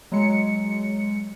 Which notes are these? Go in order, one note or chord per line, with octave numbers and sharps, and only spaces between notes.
F#3 G#3 C#7